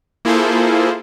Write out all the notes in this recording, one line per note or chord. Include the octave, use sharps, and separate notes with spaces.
A#3 E4 F4 G#4 A4 C5